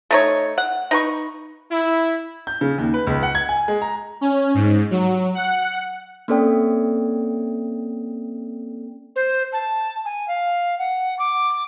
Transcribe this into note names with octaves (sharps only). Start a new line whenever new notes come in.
A3 D#4 C#5
F#5
D#4 B4 C#6
E4
G6
C#3
D#2
B4
C#2
F#5
G#6
G#5
G#3
A#5
C#4
G#2
F#3
F#5
A#3 C4 C#4 A4 D5 G5
C5
A5
G#5
F5
F#5
D6